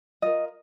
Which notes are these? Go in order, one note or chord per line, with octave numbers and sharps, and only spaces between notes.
F4 A#4 D#5